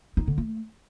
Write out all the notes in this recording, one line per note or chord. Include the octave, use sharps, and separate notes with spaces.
D#4
D3
A3